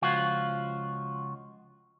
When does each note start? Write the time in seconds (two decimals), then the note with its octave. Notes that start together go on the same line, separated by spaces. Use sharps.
0.02 C#2 F3 F4 F#4